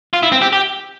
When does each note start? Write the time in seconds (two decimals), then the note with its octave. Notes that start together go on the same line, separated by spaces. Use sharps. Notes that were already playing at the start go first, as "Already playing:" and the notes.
0.13 F4
0.23 E4
0.32 C4
0.42 G4
0.53 G4